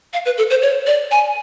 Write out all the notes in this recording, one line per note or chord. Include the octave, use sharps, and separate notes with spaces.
F5
B4
A4
C5
C#5
D5
G#5